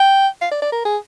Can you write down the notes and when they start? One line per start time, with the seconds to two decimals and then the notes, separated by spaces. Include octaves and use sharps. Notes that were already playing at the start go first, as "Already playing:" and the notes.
Already playing: G5
0.41 F5
0.51 D5
0.62 D5
0.72 A#4
0.85 G#4